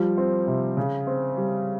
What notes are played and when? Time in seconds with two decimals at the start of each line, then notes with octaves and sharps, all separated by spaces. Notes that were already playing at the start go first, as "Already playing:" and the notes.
Already playing: F3 G3
0.17 C4
0.47 C3
0.77 C#3
1.07 C4
1.37 G3